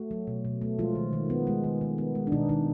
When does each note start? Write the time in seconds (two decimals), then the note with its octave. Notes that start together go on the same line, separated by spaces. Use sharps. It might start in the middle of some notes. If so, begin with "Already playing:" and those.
Already playing: A3 F#4
0.11 F#3
0.27 B2
0.45 B2
0.62 A3
0.79 F3 G#3 F4
0.95 D#3
1.13 D#3
1.30 B3
1.47 G#3
1.64 D#3
1.81 D#3
1.98 B3
2.15 G#3
2.27 D4
2.32 B2 D#3 D#4
2.49 B2 D#3 D#4